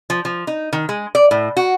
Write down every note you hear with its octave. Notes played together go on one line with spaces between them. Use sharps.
F3
F3
D#4
D#3
G#3
D5
A2
F#4